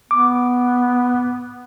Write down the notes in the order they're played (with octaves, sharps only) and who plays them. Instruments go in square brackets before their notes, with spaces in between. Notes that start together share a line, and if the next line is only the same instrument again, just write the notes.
[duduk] B3 [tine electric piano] D6